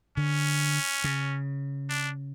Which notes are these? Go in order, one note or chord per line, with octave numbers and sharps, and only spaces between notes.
D3 C#4
C#3
D4